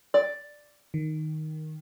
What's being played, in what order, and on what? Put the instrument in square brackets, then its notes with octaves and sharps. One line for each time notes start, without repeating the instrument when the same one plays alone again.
[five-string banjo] D5
[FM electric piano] D#3